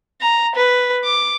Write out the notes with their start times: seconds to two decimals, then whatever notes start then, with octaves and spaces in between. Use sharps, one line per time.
0.21 A#5
0.56 B4
1.04 D6